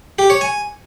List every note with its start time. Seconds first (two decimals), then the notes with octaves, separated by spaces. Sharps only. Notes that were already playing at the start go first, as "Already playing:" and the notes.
0.19 G4
0.30 C#5
0.41 G#5